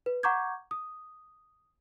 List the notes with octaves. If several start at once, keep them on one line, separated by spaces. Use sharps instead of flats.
B4
F#5 A#5 C#6 D6 G6 G#6
D#6